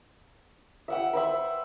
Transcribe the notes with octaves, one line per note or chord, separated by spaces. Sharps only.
E5 F#5 G5
B4 C5 E5